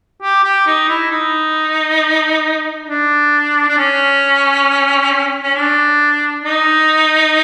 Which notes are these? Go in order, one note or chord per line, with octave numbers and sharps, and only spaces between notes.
G4
G4
D#4
E4
D#4
D4
D4
C#4
C#4
D4
D#4